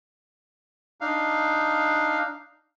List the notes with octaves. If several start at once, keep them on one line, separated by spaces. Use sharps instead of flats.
D4 D#4 F5